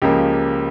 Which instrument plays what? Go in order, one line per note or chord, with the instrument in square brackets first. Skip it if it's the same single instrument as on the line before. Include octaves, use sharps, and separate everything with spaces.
[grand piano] C#2 C#3 F3 A#3 G4